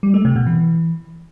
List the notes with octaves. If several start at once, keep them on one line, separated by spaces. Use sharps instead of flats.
G3
A3
C3
B2
E3